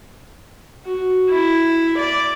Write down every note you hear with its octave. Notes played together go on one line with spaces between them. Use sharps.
F#4
E4
D5